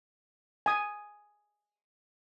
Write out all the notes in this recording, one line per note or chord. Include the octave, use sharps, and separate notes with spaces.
G#5 D#6